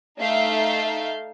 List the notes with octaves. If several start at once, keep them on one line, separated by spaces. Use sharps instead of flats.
A3 D#4 E5 F5 G6